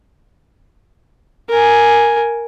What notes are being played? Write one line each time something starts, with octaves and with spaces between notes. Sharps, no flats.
A#4 G#5